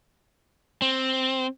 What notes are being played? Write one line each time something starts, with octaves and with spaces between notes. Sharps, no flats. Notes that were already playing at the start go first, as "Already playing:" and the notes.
C4